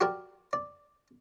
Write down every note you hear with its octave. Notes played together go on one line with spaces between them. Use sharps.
F#4 G4 A#4 D5
D5